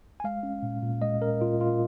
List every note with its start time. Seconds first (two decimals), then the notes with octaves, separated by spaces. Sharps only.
0.20 G#5
0.24 G#3 F5
0.43 C#4
0.63 A#2
0.83 A#2
1.02 G#3 D#5
1.21 C#4 A#4
1.41 A#2 F4
1.60 A#2 F4